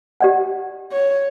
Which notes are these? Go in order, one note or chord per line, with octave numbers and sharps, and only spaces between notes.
G4 D5 F#5
C#5